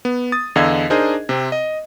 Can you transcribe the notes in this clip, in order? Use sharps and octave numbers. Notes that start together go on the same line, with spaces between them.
B3
D#6 A6
E2 D3 D#5 F5 E6 G#6
D4 D#4 G#4 A#4 C5 D#5
C3 C4
D#5